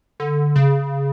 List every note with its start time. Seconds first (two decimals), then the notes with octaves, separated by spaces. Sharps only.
0.20 D3
0.56 C#3